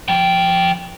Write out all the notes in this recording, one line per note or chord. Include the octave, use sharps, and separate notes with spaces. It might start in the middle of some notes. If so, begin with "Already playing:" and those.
F3 G5